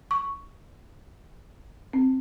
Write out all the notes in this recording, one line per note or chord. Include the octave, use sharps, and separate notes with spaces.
C#6
C4